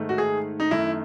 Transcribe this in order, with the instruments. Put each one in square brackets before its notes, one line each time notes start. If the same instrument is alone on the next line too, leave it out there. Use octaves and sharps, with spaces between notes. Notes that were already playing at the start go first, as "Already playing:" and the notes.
Already playing: [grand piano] G#2 D#3 A3
F#4
G#4
D#4
F#2 D#3 A3 E4